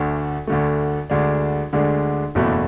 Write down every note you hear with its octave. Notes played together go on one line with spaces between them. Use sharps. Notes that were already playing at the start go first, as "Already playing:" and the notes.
Already playing: D2 D3 A3
D2 D3 A3
D2 D3 G#3 D4
D2 D3 G#3 D4
F#1 E2 B2 A3 E4